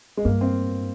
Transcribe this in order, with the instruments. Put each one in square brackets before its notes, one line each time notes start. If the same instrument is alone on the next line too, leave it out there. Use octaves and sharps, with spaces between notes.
[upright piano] G#3
[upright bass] G2 [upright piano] A#3
[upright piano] C4